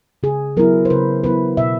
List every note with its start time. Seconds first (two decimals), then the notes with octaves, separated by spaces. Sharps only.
0.23 C#3 G#4
0.57 F#3 B3 E4 A#4
0.85 C5
0.90 C#3 B4
1.23 F#3 B3 E4 B4
1.57 B2 E5